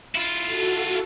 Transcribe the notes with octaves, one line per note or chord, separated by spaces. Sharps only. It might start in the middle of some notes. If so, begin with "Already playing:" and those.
E4 F4
F#4 A4